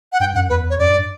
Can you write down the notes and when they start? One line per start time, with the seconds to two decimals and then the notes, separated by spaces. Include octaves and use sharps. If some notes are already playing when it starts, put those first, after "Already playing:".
0.13 F#5
0.20 G2 G5
0.35 F#2 F#5
0.50 E2 B4
0.70 C#5
0.79 F#2 D5
0.89 G2